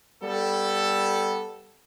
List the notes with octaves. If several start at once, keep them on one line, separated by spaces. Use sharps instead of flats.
G3 B3 A4